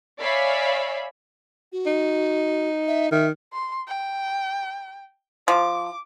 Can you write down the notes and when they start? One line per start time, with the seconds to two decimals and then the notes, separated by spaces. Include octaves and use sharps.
0.20 C#5 D5 E5 F5 G#5 B5
1.72 F#4
1.86 D#4
2.88 E5
3.11 D#3 E5
3.53 C6
3.88 G5
5.48 F3 D6